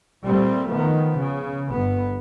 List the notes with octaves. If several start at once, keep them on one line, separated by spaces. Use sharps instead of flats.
A#2 G3 A3 C4
D#3 F3 B3
C#3
G1 B3